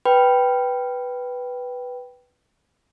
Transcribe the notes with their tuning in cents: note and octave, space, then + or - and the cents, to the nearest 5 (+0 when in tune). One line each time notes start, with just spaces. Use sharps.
B4 +0 G5 -5 B5 +0